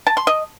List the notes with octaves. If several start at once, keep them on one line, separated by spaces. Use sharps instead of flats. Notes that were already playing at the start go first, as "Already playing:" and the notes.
A5
C6
D#5